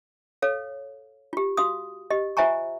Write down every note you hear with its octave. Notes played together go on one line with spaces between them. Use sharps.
A4 C#5 F5
F4 G4
F#4 F5 D#6
G4 D#5
F4 C5 E5 G#5 A#5 C#6